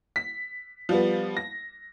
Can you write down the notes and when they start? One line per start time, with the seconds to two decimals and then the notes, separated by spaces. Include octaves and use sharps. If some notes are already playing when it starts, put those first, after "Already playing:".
0.16 B6
0.89 F3 G3 B3
1.37 A#6